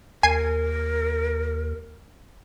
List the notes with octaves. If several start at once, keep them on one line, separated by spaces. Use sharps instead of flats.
D#2 A#4 G#5 C7 D#7